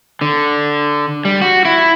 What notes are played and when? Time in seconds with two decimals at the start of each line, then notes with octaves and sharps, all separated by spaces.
0.21 D3
1.25 G3
1.42 F#4
1.65 E4